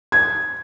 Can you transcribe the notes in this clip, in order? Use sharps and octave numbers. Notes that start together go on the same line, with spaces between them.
G#6